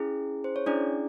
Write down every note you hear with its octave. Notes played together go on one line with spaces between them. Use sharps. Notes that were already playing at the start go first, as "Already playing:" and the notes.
Already playing: C#4 E4 G#4
C5
C#5
C#4 D4 E4 G#4 D5